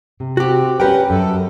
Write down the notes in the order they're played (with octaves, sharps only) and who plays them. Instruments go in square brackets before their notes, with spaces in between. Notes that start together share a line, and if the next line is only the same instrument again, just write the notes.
[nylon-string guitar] C3
[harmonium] C4 [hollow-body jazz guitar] F#4 G4
[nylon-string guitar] G3 C#4 [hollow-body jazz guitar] G4 A#4 G5 [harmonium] B4 F#5
[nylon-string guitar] F#2 [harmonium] A4